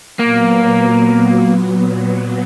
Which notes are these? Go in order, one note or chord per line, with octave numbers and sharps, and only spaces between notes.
A#2 F#3 A#3 B3